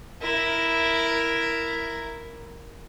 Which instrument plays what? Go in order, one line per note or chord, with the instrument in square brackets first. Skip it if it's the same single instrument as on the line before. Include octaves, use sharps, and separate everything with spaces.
[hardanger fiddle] E4 A#4